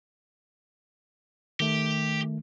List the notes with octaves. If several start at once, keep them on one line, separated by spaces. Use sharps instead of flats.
D#3 A3 G4